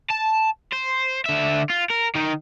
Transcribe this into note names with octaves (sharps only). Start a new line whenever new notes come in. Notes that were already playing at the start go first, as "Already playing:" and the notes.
A5
C5
D3 E5
F4
A#4
D#3 D#4